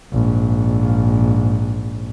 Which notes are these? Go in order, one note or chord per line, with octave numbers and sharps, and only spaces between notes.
A#1 G#2